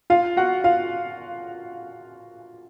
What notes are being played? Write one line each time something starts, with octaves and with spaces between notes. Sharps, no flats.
F4 F5
F#4 F#5
F4 F5